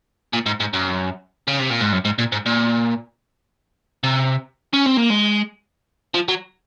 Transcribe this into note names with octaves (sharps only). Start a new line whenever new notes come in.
A#2
G#2
G#2
F#2
C#3
C3
A#2
G#2
F#2
G#2
A#2
G#2
A#2
C3
C#4
C4
A#3
G#3
F3
F#3